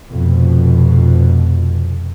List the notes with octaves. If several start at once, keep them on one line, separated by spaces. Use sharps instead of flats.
F1 F2 B2